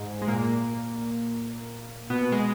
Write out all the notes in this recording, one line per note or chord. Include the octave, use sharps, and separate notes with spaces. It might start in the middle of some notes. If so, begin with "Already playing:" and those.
Already playing: G#2
G#3
A#2 A#3
B2 B3
G#3